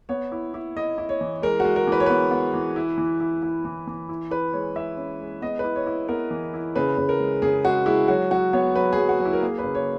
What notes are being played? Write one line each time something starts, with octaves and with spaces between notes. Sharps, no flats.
B3 C#5
E4
E4
E4 D#5
E4
C#5
E3
G#3 A#4
G#3 F#4
A#4
E3 B4
C#5
B3 B4
B3
E3
E4
E3
E4
E4
E3
E3
E4
E4 B4
G#3 C#5
E4 E5
C#4
G#3
B3 D#5
E4 B4
C#5
E4
B3 A#4
E3
E4
C#3 B4
C#3
A#4
G#3
C#3 G#4
G#3 F#4
G#3 E4
F#3 F#4
F#3 F#4
B3 C#5
F#3 B4
F#3 G#4
F#4
F#3
E4
A#4
A#3 G#4
B4
C#3
C#5